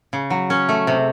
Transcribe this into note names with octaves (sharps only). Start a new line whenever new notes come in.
C#3
F#3
C#4
A3
C3